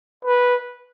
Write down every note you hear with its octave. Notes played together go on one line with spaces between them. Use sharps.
B4